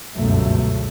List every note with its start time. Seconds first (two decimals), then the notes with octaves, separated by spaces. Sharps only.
0.14 G1 C#2 F#2 B2 A3